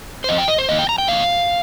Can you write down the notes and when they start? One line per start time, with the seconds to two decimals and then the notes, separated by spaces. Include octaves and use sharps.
0.24 C5
0.29 F2 F3 C4 D#5
0.38 G5
0.48 D#5
0.58 C5
0.69 F2 D#3 A#3 D#4 D#5
0.79 G5
0.89 A#5
0.98 G5
1.08 F2 D#3 A#3 D#4 F5